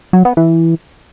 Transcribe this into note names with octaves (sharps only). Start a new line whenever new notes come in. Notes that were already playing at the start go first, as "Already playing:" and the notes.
F#3
B3
E3